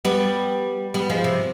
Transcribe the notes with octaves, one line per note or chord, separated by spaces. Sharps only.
G3 B3
G3 B3
F3 G#3
C3